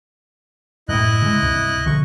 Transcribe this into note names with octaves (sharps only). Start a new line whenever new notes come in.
F#2 A2 E4 D#5 F#6
C#3 G#3
C#2 G2 C3
B1 D3 F3 C#6